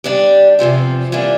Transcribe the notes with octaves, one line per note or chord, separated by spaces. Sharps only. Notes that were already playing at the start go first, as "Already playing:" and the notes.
G3 D4 G4
E2 C3 F3 C4
E3 G3 A#3 D4